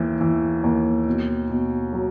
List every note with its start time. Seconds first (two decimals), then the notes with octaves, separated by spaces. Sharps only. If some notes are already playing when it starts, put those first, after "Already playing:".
Already playing: D#2 E3
0.21 E3
0.64 D#2
1.07 B2
1.50 B2
1.93 F#3